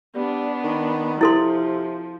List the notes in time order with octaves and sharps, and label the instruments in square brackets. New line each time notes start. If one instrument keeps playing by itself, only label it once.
[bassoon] G3 [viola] B3 D4
[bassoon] D#3
[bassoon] C3 [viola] F3 [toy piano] E4 A4 C6